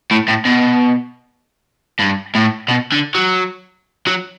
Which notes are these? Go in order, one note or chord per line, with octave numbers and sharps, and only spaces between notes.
A2
A2
B2
G2
A2
B2
D3
F#3
F#3